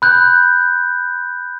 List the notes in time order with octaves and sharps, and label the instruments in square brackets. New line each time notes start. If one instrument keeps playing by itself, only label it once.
[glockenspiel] B5 F#6 G6